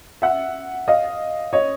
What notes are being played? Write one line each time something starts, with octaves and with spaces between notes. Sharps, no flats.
E5 F#5
D#5 F5
C#5 D#5